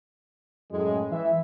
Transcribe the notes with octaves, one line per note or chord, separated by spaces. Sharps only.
F#2 A2 G#3
E3 E5